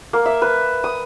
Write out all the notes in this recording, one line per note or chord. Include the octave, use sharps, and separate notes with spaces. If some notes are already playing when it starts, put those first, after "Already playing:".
A#3
E5
B4
D#6